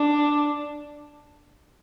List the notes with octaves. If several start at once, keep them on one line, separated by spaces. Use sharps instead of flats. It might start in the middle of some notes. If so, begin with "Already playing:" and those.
Already playing: D4